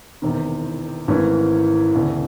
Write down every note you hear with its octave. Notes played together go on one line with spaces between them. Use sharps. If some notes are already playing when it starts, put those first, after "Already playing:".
E1 E2 C3 D#3
G#1 G#2 E3 A3 C#4
E1 D2 C#3